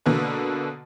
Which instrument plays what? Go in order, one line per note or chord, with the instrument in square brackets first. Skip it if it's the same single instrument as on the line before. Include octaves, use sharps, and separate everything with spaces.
[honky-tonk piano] B2 D3 A#3 B4